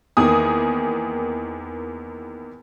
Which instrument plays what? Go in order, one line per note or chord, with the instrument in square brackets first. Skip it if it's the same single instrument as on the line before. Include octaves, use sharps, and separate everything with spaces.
[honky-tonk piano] E2 D#3 A#3 G#5 D#6